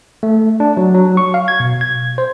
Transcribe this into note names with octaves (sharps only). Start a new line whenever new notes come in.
A3
D4
F#3
F#3
C#6
F5
G#6
B2
G#6
C5